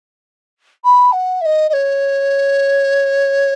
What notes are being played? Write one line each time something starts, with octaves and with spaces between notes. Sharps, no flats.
B5
F#5
E5
D#5
D#5
C#5